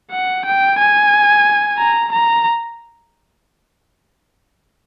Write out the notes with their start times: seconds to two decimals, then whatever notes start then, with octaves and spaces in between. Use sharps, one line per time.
0.12 F#5
0.46 G5
0.79 G#5
1.78 A#5
2.12 A#5